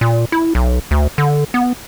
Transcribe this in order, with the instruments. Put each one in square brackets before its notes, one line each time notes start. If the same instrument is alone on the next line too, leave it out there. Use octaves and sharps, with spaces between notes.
[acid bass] A#2
E4
B1
D2
D3
B3